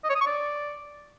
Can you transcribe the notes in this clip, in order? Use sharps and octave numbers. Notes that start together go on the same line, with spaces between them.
D#5
C#5
D#6
C#6
D5